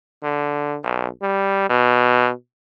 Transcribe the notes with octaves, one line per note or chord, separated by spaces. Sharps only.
D3
B1
G3
B2